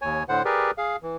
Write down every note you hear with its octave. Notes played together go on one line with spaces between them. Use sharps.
D#2 C#5 G#5
A2 D3 C5 F#5
G4 G#4 A#4 B4 D5
G#4 F5
E3